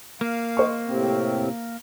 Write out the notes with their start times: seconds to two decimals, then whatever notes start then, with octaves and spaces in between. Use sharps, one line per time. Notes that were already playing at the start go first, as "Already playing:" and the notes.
0.21 A#3 F5
0.57 C5 D#5 C#6
0.87 A2 C3 C4